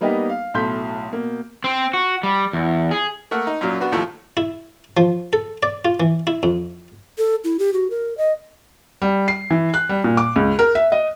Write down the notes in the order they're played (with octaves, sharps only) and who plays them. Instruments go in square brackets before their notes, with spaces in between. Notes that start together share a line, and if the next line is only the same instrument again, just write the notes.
[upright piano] G3 A#3 B3 D#4 G4
F5
B1 A2 C6 G6 B6
B2 A#3
[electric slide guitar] C4
F#4
G3
E2
G#4
[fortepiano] A3 A#3 A#4 F#5
D#4
F#2 A#2 F#3
B3 D4 F#4
D#2 A2 F3 A3
[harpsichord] E4
F3
A4
D5
F4
E3
E4
F2
[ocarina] A4
E4
G4
F#4
A#4
D#5
[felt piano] G3
C7
E3
F#6
G3
A#2
D6
C#2
A#4
E5
D#5